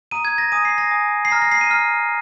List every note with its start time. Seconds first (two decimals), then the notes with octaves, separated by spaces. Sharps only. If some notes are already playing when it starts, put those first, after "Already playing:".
0.11 A#5 D#6 D#7
0.25 G#6
0.38 A#6
0.52 G#5 D#6 D#7
0.65 C7
0.78 A#6
0.91 G#5 D#6
1.25 C7
1.31 A#5 F6 A#6
1.42 A#6
1.52 C7
1.61 D#7
1.70 A#5 F6